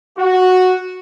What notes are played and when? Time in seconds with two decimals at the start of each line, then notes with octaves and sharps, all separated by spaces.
0.18 F#4